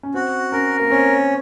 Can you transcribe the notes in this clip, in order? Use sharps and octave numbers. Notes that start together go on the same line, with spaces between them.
C#4
C4 F#4
C#4 A#4
A#3
C4 C#4